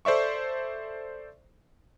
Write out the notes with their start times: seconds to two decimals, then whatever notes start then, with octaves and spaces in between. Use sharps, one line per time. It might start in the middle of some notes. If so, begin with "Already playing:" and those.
0.05 A4 C5 D5 E5 C#6